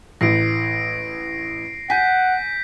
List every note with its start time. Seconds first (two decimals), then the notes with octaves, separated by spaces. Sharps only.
0.21 A1 A2 A#6 C7 D7
1.90 F#5 G#5 G6 B6